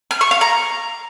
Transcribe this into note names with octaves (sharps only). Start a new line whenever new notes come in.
F6
C#6
F5
A#5